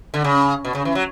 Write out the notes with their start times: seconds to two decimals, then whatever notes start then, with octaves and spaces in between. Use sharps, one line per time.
0.14 D3
0.24 C#3
0.65 B2
0.75 C#3
0.85 E3
0.95 F#3